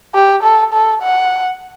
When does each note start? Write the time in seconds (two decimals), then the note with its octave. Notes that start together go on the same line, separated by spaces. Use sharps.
0.15 G4
0.43 A4
0.73 A4
1.02 F#5